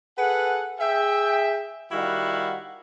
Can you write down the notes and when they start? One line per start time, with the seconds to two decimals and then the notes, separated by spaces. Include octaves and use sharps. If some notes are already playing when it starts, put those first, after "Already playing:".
0.18 G#4 A4 B4 F#5
0.80 G#4 E5 G5
1.92 D#3 G3 E4 F#4 F5 F#5